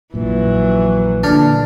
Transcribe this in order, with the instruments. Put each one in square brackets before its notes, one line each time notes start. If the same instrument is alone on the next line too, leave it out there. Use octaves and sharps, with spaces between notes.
[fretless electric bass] A#1 F#2 A#2 [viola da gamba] E3 F#3
[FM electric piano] A#2 D3 F6 [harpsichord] D4